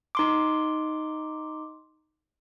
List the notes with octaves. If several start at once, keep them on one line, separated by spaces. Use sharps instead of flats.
D#4 C6 D6